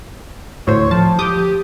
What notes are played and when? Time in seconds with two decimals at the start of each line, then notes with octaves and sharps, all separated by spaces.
0.67 D2 A2 C5 C#5
0.91 F3 A5
1.19 G4 D6 D#6 G6